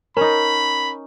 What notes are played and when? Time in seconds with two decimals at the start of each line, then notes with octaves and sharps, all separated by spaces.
0.17 C#4 D#4 A#4 B5